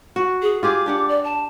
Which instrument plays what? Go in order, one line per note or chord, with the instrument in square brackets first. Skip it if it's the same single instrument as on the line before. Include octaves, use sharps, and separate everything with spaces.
[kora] F#4
[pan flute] G#4
[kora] F4 G4 G#4 [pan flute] D6
[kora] D4 G4 F#5
[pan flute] D5
A5